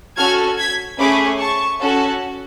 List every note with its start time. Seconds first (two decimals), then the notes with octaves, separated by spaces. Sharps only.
0.17 C#4 F#4 A4 F6 G#6
0.58 G#6 B6
0.98 A3 C#4 G#4 B5 D6
1.39 A5 C#6
1.80 C#4 F#4 A4